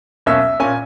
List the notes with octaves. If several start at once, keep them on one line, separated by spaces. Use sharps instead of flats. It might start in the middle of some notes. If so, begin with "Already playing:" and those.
B1 B2 A#3 C#4 E5
A#2 A#3 C#4 G#5